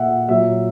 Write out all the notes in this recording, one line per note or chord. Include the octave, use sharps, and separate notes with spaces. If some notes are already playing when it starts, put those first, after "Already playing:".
Already playing: A#2 E5 F#5
A#2 F#3 E5